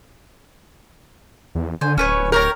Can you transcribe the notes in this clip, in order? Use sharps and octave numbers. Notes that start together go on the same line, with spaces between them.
E2
D3 C5 G#5
D1 C#4 B4 C#5
G4 A#4 C#5 A#5